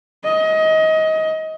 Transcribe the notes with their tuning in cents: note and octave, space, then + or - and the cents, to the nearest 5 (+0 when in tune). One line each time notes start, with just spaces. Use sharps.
D#5 +25